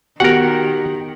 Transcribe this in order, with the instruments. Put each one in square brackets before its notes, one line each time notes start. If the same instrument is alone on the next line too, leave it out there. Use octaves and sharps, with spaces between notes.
[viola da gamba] D#3 [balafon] B3 F#4 [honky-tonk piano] G4 [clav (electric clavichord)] A#4 F#5